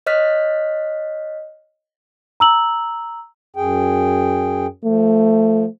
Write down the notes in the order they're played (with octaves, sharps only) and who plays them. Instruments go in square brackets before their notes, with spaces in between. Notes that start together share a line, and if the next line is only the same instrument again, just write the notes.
[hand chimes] C#5 D#5 F6 F#6 B6
[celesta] A#5 E6 F#7
[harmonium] F#2 G#4 G5
[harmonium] F3 [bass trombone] A3